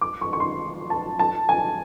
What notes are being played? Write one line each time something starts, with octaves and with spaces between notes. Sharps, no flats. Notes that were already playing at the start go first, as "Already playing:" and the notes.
D6
C#6
C#6
C6
A5
A5
G#5